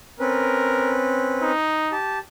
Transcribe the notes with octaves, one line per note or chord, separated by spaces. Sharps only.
C4 C#4 A#4 B4
D#4
G4 A5